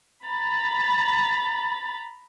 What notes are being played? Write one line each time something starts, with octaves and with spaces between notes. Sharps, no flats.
A#5 B5 A6